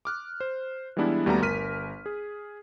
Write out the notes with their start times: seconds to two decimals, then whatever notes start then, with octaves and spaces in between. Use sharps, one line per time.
0.05 D6 F6 F#6
0.40 C5
0.97 E3 G3 G#3 B3 D4 E4
1.26 D#2 G3 A3 B3 F#4 A#5
1.42 G1 A#4 F6 B6 D#7
2.06 G#4